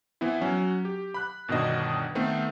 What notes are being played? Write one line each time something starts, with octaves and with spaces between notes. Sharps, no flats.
E3 B3 C4 E4
F#3 C#4 F#4
G4
B5 F#6
G1 B2 D#3 D4 D#5
D#3 A3 B3 C4